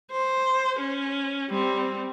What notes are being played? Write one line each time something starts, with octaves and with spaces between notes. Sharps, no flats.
C5
C#4
G3 C4